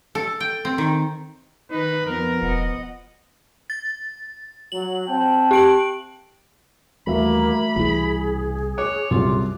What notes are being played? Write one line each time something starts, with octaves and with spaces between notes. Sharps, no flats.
A4
G5
C4
D#3
D#3 D#4 B4
F2 F3 B3 A#4
E1 D#5 F#5
A6
F#3 F#7
C4 G5 A5
G4 D7 F#7
D#2 E3 G3 A3 A#3 F#4 E5 B5
C2 B2 E3 G3 G#4
C#5 D6 F#6
C2 F#2 A#2 F4